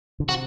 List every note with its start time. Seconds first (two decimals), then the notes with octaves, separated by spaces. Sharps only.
0.20 D3
0.29 C3 F#4